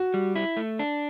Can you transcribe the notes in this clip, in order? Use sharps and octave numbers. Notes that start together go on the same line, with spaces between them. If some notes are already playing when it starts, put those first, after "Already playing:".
Already playing: F#4
G3
E4
A3
D4